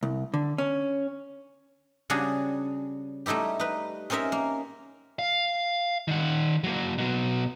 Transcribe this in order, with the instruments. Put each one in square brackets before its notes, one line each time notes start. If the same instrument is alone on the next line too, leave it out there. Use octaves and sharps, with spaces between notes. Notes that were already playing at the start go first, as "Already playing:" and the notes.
[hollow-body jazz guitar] C2
D3
C#4
[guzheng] C#3 G3 D4 F#4 G#4
G3 A3 D#4 E4 G4
D#4 B4
C4 C#4 D#4 A#4 E5
A#3
[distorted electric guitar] F5
D#3 F#5
F#3 A#3
B2 F#3